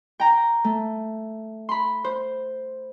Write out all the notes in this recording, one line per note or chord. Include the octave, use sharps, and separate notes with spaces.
G5 A#5
A3
B5 C6
C5